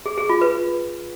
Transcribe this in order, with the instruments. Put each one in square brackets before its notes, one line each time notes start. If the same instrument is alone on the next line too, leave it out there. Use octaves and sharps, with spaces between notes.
[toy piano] G#4
G#4
F4
B4